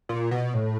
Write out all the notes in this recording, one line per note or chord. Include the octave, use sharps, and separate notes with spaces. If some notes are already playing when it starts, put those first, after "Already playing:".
A#2
B2
A2